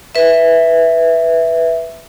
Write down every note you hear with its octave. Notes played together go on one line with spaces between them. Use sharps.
B4 E5